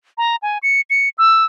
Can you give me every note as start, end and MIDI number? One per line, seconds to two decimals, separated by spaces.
0.18 0.36 82
0.42 0.58 80
0.63 0.81 97
0.90 1.09 97
1.18 1.45 88